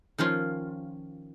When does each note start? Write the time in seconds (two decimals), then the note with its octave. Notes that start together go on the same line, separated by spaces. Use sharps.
0.18 D#3 F3 C#4 F4